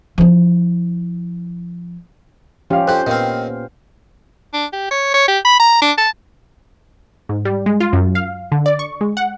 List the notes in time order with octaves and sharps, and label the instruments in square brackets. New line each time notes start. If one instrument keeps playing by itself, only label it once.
[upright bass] F3 E4
[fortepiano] F3 F5 [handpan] C#4 F4 G4
[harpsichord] F2 G4 [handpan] C5 [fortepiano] F#6
[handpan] A#2 B3 F5 [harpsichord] D#3 C4
[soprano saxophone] D4
G4
C#5
C#5
G4
B5
A#5
D4
A5
[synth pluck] G#2
G3
G#3
F4
F#2
F5
D3
D5
C#6
G#3
F#5